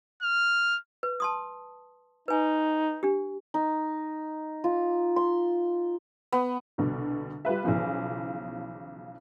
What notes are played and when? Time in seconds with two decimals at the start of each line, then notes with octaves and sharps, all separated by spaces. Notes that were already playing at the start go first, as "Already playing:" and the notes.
0.22 F6
1.03 B4
1.20 A5 C6 D#6
2.28 D#4 B4 G#5
3.03 D4 G4
3.54 D#4
4.64 F4
5.16 C6
6.32 B3
6.78 C2 B2 D3
7.45 G3 F4 B4 E5
7.64 B1 C#3 E3 F3 B3